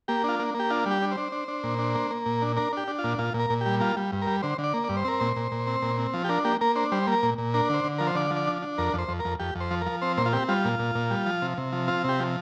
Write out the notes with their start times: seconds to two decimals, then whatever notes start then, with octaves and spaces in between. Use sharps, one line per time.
0.08 A#3 G4
0.24 D4 F4
0.39 A#3
0.54 A#3
0.59 G4
0.70 D4 F4
0.86 G3 G4
1.02 D4
1.12 C5
1.17 D4
1.32 D4
1.48 D4
1.63 A#2
1.79 D4
1.95 A#3
2.11 A#3
2.26 A#2
2.42 D4
2.56 D4 A#4
2.73 D4 G4
2.88 D4
2.99 F4
3.04 A#2
3.19 A#2 F4
3.34 A#2
3.40 A#4
3.50 A#2
3.61 G4
3.66 G3
3.80 A#3 F4
3.96 G3
4.12 G2
4.22 A#4
4.27 G3
4.42 D3 C5
4.58 D3
4.64 D5
4.74 A#3
4.84 G2 D5
4.97 C5
5.05 C4 A#4
5.20 A#2 C5
5.36 A#2
5.52 A#2
5.67 C4
5.82 A#2
5.98 C4
6.14 F3
6.24 G4
6.29 D4 A#4
6.44 A#3 G4
6.61 A#3 A#4
6.76 D4 C5
6.92 G3 C5
7.07 A#3
7.12 A#4
7.23 A#2
7.38 A#2
7.54 D4 A#4
7.70 D3 C5
7.84 D3
7.98 F3 A#4
8.07 C5
8.15 D3 D5
8.31 F3
8.36 D5
8.47 D4
8.62 D4
8.78 F2 A#4
8.94 F2 C5
9.08 F2
9.20 A#4
9.25 F2
9.39 F2 G4
9.55 F2
9.60 C5
9.71 F3
9.81 F3 A#4
10.02 C4 C5
10.17 A#2 C5
10.26 F4
10.33 C4 G4
10.49 G3 F4
10.65 A#2
10.79 A#2
10.95 A#2
11.11 G3
11.26 F3
11.42 C3
11.58 C3
11.73 F3
11.88 C4 F4
12.04 C3 G4
12.20 F3